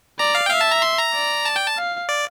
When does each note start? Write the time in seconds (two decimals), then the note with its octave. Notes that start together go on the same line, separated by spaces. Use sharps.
0.19 D5 A#5
0.35 F5
0.46 G5
0.50 E5 F5
0.61 A5
0.71 A#5
0.82 C6
0.98 A#5
1.14 D5
1.45 A5
1.56 G5
1.67 A5
1.77 F5
2.09 D5